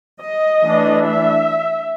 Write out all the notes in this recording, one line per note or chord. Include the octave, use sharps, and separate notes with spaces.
D#5
E3 A3 D4
E5